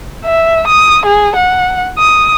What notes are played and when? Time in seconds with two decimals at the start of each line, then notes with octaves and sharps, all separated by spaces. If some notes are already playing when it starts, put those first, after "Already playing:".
0.25 E5
0.68 D#6
1.06 G#4
1.36 F#5
1.99 D#6